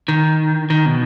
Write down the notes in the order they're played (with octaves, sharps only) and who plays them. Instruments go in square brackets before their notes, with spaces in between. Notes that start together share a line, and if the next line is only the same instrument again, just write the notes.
[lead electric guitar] D#3
D#3
B2